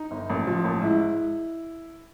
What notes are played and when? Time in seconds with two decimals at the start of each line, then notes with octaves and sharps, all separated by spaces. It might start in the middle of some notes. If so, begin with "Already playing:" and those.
Already playing: D#4
0.11 G1
0.30 A1
0.47 F3
0.64 A1
0.82 G#2 E4